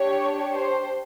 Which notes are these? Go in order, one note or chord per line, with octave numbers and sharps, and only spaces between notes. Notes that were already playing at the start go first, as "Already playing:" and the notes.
Already playing: D4 G4 C#5
C5